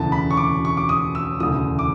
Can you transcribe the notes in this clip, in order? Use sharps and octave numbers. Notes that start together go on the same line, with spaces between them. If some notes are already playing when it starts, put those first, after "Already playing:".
Already playing: E1 D2 C#3 E3 A5
B5
C#6
D6
C#6
D6
D#6
E6
E1 D2 C#3 E3 D#6
D6